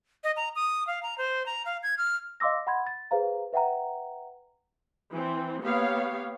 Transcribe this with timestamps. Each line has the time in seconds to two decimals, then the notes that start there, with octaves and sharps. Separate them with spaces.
0.24 D#5
0.37 A#5
0.55 D#6
0.87 F5
1.03 A#5
1.18 C5
1.46 A#5
1.66 F5
1.83 G#6
1.98 F6
2.40 D#5 F5 C6 D6 E6 A#6
2.67 F#5 B5 C6 G#6
2.87 A6
3.11 G#4 B4 C5 F5 A#5
3.53 B4 E5 F#5 G5 A#5
5.11 E3 C4
5.62 A#3 B3 G4 C#5 F5